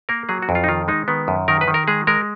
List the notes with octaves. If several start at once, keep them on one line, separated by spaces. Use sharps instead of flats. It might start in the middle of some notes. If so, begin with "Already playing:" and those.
A#3 A#4
F#3 G#4
F#4
F2
F4
D#4
D#3 F4
G#3 D#4
D#3 B3
F#2
D#3 A#4
B4
D#3
A#4
G#3 G#4
G#3 A#4